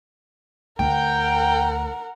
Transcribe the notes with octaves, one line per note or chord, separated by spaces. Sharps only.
D2 A#4 F#5 G5